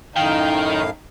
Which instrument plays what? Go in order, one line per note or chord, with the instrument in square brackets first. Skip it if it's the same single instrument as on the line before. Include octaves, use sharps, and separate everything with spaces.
[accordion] F#2 A2 F5 [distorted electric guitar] D#3 [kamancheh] D#4 [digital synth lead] G5